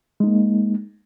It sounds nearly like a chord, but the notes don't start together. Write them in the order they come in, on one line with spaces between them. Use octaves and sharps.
G#3 D#4 A#3